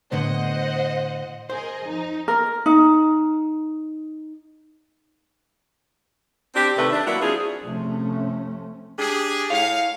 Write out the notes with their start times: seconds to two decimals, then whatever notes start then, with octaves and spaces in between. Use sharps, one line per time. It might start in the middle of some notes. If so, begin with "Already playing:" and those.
0.12 A2 D3 B3 C5 D#5 F#5
1.50 G#4 A#4 C5 D#5
1.87 F2 D#4
2.28 A#4
2.66 D#4
6.55 C4 D4 G4
6.77 C3 D#3 A3 B4 E5
6.93 D4
7.06 F#3 A#3 E4 F#4 F#5
7.22 C4 D4 F4 G#4
7.61 C3 F3 A3 C4 C#4
8.99 D4 G4 G#4
9.50 A2 C#5 F5